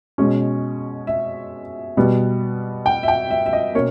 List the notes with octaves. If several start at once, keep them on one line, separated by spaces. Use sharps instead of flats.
B2 G#3 C#4
E5
B2 G3 B3
G5
E5
G5
E5
E5
D#5
B2 A#3 C#4 C#5